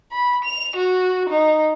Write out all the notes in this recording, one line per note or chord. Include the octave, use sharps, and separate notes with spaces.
B5
F7
F#4
D#4